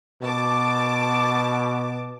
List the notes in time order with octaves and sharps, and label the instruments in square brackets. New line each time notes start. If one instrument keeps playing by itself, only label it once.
[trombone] B2 [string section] A5 D6